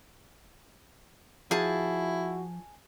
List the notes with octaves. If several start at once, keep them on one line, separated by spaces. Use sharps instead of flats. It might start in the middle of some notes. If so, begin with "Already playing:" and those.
F3 E4 F#4 G#4 A5